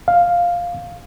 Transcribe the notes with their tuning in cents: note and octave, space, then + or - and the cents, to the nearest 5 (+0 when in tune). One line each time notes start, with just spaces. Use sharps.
F5 +5